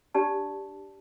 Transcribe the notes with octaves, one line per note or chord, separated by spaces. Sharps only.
D4 G4 D5 A5